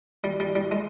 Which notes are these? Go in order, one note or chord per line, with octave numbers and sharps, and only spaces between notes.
G3
G3
G3
G#3